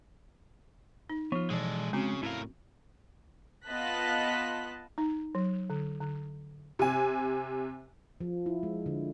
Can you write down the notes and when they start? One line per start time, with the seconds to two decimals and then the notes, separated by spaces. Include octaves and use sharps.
1.10 D#4
1.32 F3 B3 F4
1.50 B2 E3 G#3 A4 D5
1.93 C#3 G#3 C4 C#4 F#4
2.23 A2 E4 A#4 F5
3.67 B3 F4 D#5 A5 F#6 B6
4.98 D#4
5.35 F#3
5.70 D3
6.00 D3
6.79 C3 G#5
8.21 F3
8.46 E4
8.63 G#3
8.86 D3